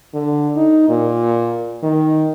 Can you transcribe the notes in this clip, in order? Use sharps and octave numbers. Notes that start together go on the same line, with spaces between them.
D3
D#4
A#2
D#3